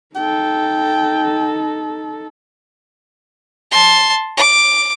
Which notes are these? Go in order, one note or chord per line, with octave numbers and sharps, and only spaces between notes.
D#4 A4 G5
A5 C6
D6